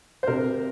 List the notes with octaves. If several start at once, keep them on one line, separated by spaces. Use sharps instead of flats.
C5
C3 A#4